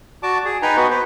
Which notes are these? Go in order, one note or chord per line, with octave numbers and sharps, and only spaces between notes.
F#4 D5 A5 D6
G#4
D#4 B4 G5 G#5 A#5
B3 F#4 B4 F#5
B4 C5